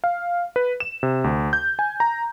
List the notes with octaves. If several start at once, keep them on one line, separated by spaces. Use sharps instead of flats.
F5
B4
E7
C3
D2
G6
G#5
A#5